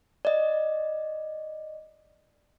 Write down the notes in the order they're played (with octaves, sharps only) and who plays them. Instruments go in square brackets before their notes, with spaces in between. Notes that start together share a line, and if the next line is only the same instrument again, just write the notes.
[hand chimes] D5 D#5